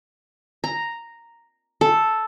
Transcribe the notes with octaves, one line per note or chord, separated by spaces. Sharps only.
A#5
A4